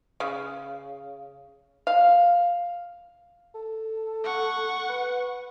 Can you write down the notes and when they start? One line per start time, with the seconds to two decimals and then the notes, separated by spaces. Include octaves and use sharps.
0.20 C#3
1.87 F5
3.55 A4
4.24 F#5 C#6
4.89 B4